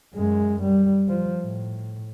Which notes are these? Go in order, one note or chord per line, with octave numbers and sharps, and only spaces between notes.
F#2 G#3
G3
F3
A2